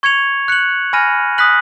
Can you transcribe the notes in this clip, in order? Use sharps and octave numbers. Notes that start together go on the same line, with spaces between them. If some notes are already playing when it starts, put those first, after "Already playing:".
C#6 G#6 C#7 F7
F#6 C#7 F#7
G#5 B5 F6 A#6 D#7
D#6 F#6 B6 F#7